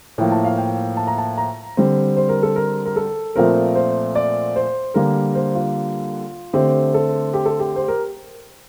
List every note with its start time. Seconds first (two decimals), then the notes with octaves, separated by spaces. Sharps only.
0.18 A2 F3 A#3 G5
0.32 A5
0.45 F5
0.58 G5
0.97 A5
1.07 A#5
1.18 A5
1.38 A#5
1.77 D3 G3 C4
2.16 C5
2.29 A#4
2.43 A4
2.56 A#4
2.86 A#4
2.96 A4
3.36 A#2 F3 A3 C4 A#4
3.75 C5
4.15 D5
4.56 C5
4.94 D3 G3 A#3 A#4
5.35 C5
5.55 F4
6.53 D3 A3 C4 G4
6.94 A4
7.34 G4
7.46 A4
7.59 G4
7.76 C5
7.88 A#4